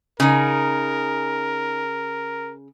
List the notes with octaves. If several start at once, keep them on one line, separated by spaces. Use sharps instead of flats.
C#3 D#4 G#4 A#4